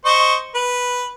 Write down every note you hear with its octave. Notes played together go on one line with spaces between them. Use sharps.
C5 D#5 C#6
B4